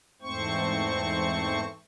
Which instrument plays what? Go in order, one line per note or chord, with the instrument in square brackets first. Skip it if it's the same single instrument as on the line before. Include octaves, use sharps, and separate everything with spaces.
[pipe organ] E2 G#2 A3 C4 C5 C#6